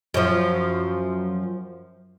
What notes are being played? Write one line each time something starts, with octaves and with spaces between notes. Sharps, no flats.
F#2 F3